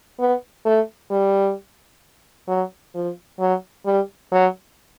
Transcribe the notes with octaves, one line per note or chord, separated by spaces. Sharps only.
B3
A3
G3
F#3
F3
F#3
G3
F#3